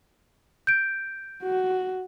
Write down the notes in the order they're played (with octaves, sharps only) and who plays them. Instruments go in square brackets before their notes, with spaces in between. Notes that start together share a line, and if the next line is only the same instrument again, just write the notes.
[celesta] G6 D7
[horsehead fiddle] F#4